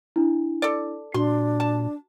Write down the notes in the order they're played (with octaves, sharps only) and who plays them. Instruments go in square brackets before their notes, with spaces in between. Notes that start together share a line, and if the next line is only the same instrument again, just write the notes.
[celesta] D4 E4
[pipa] A4 D5
[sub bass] A#2 [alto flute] D4 [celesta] F#4 [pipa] C6
[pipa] A5